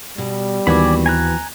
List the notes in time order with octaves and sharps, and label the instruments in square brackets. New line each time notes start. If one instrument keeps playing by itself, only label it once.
[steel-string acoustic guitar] B2 [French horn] G3
[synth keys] D#2 B3 [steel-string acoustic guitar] E3 C4 F#4 [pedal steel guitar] D5 G#5 B5
[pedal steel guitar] G#5 A#5 F#6